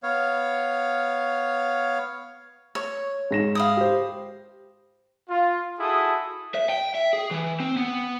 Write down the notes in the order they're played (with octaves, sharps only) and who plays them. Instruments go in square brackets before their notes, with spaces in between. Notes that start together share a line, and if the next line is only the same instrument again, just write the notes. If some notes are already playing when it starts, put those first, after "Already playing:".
[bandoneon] B3 C#5 F5
[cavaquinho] C#5
[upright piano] G#2 A#6 E7
[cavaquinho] F5 B5 D#6
[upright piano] G4 C5
[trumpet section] F4
E4 F#4 G#4 A4 D#6
[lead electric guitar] E5
G5
E5
G#4
E3
C4
B3